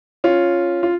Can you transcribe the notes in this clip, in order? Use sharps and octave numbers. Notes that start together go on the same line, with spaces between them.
C#4 F4
F4